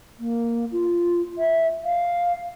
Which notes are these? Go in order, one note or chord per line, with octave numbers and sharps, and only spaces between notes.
A#3
F4
E5
F5